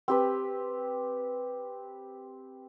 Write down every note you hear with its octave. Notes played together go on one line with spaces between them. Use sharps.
C4 G4 B4